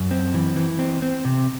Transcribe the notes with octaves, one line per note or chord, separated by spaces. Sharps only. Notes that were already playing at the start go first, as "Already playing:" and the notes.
Already playing: F#2
C4
E3
E3
C4
C4
C3